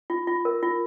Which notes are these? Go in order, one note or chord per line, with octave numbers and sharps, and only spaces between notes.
F4
F4
A#4
F4